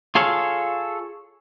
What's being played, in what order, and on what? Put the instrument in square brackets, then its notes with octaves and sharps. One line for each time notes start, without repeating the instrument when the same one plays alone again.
[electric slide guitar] F4 G#4 A4 C#5 F5